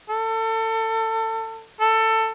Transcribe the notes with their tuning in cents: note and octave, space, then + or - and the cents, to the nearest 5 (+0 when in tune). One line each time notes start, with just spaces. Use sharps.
A4 +30
A4 +20